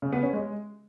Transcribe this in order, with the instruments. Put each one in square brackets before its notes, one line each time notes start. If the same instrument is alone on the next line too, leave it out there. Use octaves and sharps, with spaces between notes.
[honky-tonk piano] C#3
B3
C#4
G#3